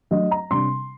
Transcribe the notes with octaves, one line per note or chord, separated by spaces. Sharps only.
F#3 A3 D4 D#5
A#5
C3 G3 D4 C6